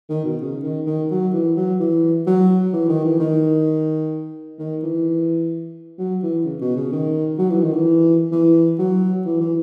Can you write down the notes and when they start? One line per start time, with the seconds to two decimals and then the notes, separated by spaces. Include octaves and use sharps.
0.10 D#3
0.24 B2
0.41 C#3
0.63 D#3
0.86 D#3
1.11 F#3
1.33 E3
1.57 F#3
1.80 E3
2.27 F#3
2.73 E3
2.89 D#3
3.04 E3
3.19 D#3
4.59 D#3
4.83 E3
5.99 F#3
6.23 E3
6.45 C#3
6.61 B2
6.77 C#3
6.92 D#3
7.39 F#3
7.50 E3
7.62 D#3
7.73 E3
8.32 E3
8.79 F#3
9.25 E3
9.41 E3